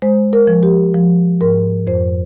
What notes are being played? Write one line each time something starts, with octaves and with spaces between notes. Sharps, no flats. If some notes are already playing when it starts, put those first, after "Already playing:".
G#3 C5
A#4
F3
G4
F3
G#2 A#4
F2 C5